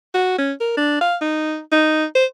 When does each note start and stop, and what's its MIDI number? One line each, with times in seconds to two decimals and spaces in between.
0.14 0.37 66
0.38 0.53 61
0.60 0.75 70
0.77 0.98 62
1.01 1.16 77
1.21 1.59 63
1.72 2.05 63
2.15 2.25 72